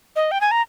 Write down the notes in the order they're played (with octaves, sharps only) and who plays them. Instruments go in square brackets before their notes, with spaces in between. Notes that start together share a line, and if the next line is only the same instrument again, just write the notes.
[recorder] D#5
G5
G#5
A#5